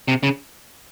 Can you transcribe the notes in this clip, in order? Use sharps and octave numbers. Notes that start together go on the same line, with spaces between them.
C3
C#3